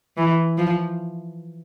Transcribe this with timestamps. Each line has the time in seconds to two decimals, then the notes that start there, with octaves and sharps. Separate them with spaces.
0.17 E3
0.58 F3